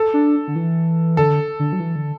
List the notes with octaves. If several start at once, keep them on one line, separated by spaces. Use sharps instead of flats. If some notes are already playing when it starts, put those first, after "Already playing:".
Already playing: A4
D4
D3
E3
D3 A4
D3
F#3
E3
D3